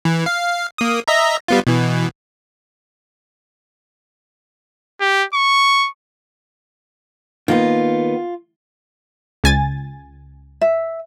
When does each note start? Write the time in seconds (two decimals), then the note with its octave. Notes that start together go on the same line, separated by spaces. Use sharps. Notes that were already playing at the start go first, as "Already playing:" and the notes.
0.05 E3
0.26 F5
0.78 A#3 D#6
1.08 D#5 E5 A#5
1.48 G3 B3 F4
1.67 B2 E3
5.00 G4
5.34 C#6
7.48 D#3 A#3 B3 F4
9.44 C#2 G#5 A6
10.61 E5